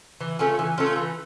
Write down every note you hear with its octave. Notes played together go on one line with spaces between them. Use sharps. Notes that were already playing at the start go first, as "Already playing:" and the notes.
E3
A3 C#4 F4
E3
A3 C#4 F4
E3